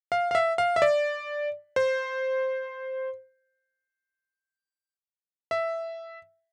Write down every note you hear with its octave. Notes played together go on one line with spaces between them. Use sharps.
F5
F5
E5
F5
E5
D5
C5
E5